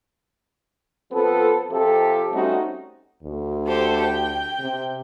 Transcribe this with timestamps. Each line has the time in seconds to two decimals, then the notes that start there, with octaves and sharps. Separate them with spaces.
1.12 F3 B3 C4 A4
1.70 F2 C3 F3 G4 A4
2.32 G3 A3 C4 C#4 D#4 F#4
3.23 D2
3.68 G4 A4 C5
4.01 G5
4.59 C3